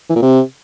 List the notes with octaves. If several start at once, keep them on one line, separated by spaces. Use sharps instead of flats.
E3
A#2
C3